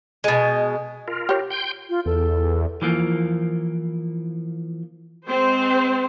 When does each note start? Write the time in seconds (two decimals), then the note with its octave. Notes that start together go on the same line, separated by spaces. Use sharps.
0.24 B2 G#3
1.08 F4 A#4
1.29 G4 C#5
1.50 G5 C6 G6
1.90 F4
2.06 E2 A4
2.82 E3 F3 A#3
5.26 G#3 C4 C5